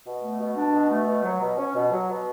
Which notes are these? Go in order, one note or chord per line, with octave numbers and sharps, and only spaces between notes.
B2
A3
B2
D4
B2
A3
B2
F#3
B2
C#4
B2
F#3
B2